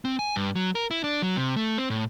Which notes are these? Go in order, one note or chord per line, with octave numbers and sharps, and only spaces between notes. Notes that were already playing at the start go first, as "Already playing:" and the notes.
C4
G#5
G2
F#3
A#4
E4
D4
F#3
C3
A3
C4
A2